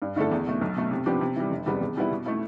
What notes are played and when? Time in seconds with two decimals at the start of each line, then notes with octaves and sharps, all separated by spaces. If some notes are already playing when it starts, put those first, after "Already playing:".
0.02 G2
0.16 D3 A3 E4 A4
0.32 E2
0.47 B2 A3
0.61 B1
0.76 B2 A3
0.91 C3
1.06 F3 B3 D4 G4
1.21 C3
1.36 E3 G3
1.51 F1
1.66 E2 C3 G3 B3
1.81 E2
1.96 B2 G3 B3 E4
2.11 B2
2.26 A3 E4